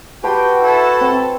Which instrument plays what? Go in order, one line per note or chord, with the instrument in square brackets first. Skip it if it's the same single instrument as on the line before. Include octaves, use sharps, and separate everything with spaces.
[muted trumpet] F#4 [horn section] G4 G5 [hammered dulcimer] B4 A5 C6
[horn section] E4 A4
[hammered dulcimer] C4